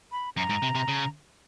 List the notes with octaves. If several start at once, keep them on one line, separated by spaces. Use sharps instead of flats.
B5
F#2 A#5
G#2
C3
C3
C#3